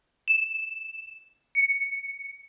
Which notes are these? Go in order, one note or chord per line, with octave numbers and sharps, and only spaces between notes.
E7
C#7